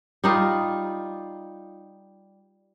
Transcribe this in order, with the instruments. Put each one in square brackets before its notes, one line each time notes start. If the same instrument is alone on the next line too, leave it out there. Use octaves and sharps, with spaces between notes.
[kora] G3 D#4 F4